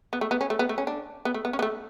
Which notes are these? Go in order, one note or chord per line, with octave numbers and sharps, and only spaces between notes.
B3
A3
B3
C#4
A3
B3
A3
C#4
D4
B3
A3
B3
C#4
B3
A3